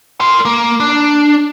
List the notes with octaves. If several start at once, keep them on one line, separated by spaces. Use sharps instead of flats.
A#4 C6
A#3
D4